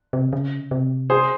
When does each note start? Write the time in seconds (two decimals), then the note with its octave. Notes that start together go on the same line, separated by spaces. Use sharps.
0.13 C3
0.33 C#3
0.71 C3
1.10 G#4 C5